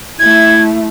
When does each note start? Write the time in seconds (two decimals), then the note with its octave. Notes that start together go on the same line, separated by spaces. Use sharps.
0.20 A3 E4 G#6